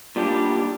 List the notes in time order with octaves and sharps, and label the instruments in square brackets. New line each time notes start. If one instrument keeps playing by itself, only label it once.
[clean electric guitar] A#2 G3 D4 G4